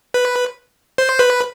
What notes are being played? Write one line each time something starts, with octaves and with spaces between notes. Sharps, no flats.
B4
C5
B4